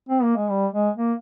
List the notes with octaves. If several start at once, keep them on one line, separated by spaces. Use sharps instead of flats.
C4
A#3
G#3
G3
G#3
A#3